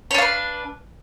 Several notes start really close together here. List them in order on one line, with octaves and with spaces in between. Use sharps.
C#5 D4 F5 B4